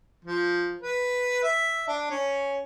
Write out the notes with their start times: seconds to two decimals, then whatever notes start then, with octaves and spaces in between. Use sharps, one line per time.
0.25 F3
0.81 B4
1.43 E5
1.88 D4
2.10 C#4